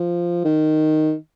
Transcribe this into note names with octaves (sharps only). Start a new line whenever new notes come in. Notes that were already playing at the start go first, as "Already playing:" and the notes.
Already playing: F3
D#3